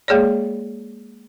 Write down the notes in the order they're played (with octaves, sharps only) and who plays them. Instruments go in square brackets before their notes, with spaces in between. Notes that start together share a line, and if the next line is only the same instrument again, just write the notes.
[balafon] G#3 A#3 G#4 C#5 D5